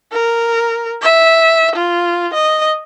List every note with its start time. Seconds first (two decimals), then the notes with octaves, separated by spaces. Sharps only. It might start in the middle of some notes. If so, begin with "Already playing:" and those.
0.12 A#4
1.02 E5
1.75 F4
2.34 D#5